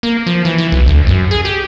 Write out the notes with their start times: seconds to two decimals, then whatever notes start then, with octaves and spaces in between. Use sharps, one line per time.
0.03 A#3
0.26 F3
0.45 E3
0.58 E3
0.72 B1
0.87 D2
1.07 F#2
1.31 G#4
1.45 G4